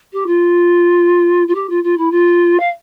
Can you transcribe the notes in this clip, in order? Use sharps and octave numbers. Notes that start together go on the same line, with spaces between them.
G4
F4
F4
G4
F4
F4
E4
F4
F5